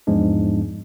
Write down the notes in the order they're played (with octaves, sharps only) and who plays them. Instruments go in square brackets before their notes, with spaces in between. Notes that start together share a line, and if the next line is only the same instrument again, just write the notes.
[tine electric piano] E2 G#2 F3 G#3 B3 D4